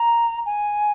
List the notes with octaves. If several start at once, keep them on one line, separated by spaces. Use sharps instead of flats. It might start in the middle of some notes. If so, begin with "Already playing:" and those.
Already playing: A#5
G#5